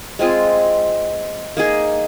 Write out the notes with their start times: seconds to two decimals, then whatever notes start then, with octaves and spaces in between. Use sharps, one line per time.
0.19 G#3 C4 F4 G#4
1.57 A#3 D#4 G#4